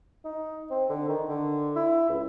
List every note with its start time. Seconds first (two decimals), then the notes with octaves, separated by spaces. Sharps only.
0.24 D#4
0.70 C4
0.89 D3
1.08 D#3
1.29 D3
1.76 E4
2.09 C#2